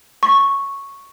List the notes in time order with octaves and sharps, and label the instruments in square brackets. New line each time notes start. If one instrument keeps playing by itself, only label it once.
[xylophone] C#6